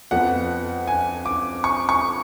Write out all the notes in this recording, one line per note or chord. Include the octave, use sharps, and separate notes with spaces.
F2 F3 B3 F#5
G#5
D6
C#6
C#6